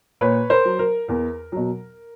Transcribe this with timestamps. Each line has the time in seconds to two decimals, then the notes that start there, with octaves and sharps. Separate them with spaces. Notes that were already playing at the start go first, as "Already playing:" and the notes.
0.21 A#2 B4 C#5
0.50 A#4 C5
0.65 F#3
0.79 A#4
1.08 E2 A#4
1.52 B2 F#3